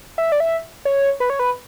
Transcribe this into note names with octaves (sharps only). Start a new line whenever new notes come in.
E5
D5
E5
C#5
B4
C#5
B4